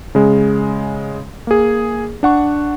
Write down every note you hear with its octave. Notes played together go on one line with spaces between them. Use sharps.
C#3 G#3
A#3 G#4
D4 F#5 C#6